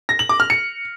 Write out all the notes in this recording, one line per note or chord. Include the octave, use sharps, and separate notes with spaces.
A#6
F#7
D6
F6
C#7